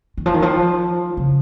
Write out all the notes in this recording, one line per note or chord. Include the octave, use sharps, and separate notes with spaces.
D#3
F3
D#3
F3
C#3